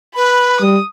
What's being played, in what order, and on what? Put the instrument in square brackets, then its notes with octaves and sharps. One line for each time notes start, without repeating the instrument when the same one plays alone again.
[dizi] B4 [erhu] B5
[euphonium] G3 [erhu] D#6